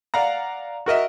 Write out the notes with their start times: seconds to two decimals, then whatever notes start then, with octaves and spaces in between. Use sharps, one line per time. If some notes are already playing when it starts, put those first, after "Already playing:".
0.14 D5 F5 F#5 A#5
0.86 F#4 A#4 D#5 E5